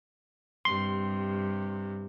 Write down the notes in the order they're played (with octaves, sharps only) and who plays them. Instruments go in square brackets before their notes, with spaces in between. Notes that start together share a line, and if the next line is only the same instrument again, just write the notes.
[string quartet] G2 C3 [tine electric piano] C6